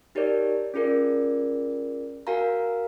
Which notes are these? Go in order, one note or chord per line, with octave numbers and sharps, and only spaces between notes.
D#4 G4 A#4 C#5 D5
C#4 F4 G#4 A#4 D5
F#4 A#4 F5 G#5 A#5